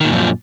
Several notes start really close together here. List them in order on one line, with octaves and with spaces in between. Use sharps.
D#3 A#2 F#2 F3